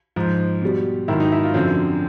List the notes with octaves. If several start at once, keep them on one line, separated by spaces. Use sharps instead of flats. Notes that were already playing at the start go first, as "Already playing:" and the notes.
G#2 F3
B2 G3
G#2 D#3 F#3 E4
D#4
E4
F4
F#2 D3 F3 C4